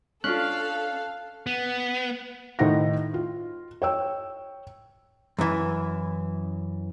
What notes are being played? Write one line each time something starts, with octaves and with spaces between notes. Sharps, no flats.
C#4 D4 F4 A4 F5 F#6
B3
A2 D#3 D#4 C5 F#5 A#6
F4
C#5 G5 E6
F#2 E3